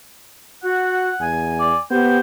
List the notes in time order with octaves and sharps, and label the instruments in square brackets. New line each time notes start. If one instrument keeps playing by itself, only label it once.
[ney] F#4 [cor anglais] F#5
[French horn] E2 [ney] G#5
[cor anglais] D5
[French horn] B3 [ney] G4 [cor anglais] C5